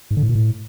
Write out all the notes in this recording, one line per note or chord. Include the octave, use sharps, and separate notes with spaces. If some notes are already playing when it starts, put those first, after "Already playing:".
G#2
D3
A2
A#2
A2